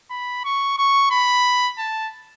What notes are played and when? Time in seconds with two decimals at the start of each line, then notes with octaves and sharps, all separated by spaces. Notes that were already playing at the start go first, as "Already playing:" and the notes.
0.10 B5
0.44 C#6
0.78 C#6
1.11 B5
1.79 A5